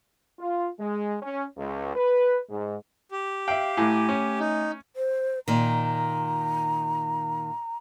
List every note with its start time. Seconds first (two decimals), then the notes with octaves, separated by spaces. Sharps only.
0.39 F4
0.78 G#3
1.22 C#4
1.57 C#2
1.95 B4
2.49 G#2
3.11 G4
3.48 E5 F5 G5
3.77 A2 A3 G#5
4.09 C#4
4.39 D#4
4.96 C5
5.48 A#2 D#3 A#5